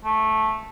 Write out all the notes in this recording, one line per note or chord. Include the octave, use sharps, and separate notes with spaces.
A3